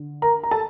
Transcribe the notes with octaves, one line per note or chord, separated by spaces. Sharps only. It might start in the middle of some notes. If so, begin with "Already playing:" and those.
Already playing: D3
A#4 A#5
A#5
A4 A5